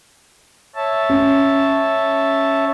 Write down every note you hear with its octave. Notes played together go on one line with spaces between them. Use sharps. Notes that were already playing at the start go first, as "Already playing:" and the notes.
C#5 E5 A5
C#4